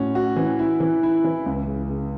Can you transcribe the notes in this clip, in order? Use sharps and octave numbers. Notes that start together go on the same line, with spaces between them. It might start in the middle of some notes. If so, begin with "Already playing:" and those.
Already playing: A2 C#4 F#4
F#4
E3
E4
E3
E4
E3
C#2
C#3
C#3